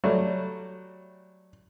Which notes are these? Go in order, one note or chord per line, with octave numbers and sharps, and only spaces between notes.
F#3 G3 A3